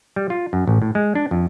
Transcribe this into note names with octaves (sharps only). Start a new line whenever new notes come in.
G3
F4
F#2
A1
A2
G#3
D4
F2